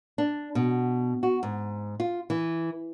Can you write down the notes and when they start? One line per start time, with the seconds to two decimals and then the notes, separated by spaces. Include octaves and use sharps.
0.18 D4
0.55 B2
1.23 F#4
1.43 G#2
2.00 F4
2.30 E3